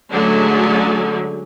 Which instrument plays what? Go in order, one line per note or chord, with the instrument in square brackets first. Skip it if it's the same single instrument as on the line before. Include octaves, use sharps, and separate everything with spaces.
[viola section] D3 F#3 G#3 A3 C#4